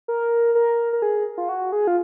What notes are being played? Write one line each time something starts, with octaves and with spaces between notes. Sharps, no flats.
A#4
A#4
A#4
G#4
F4
F#4
G#4
F4